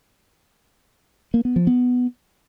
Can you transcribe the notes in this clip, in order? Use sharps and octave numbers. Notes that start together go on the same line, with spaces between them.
A#3
B3
F3
B3